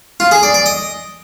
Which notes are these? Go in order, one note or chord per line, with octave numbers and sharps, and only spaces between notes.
F4
G#4
D5
D5
D#5